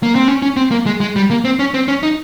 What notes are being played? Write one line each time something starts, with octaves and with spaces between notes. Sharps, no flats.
A#3
C4
C#4
C#4
C4
A#3
G#3
G#3
G3
A#3
C4
C#4
C4
C#4
D#4